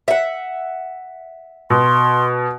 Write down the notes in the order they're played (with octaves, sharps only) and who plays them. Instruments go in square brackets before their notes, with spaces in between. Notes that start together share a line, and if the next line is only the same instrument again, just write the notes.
[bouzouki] E5 F#5
[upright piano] B2 [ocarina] C6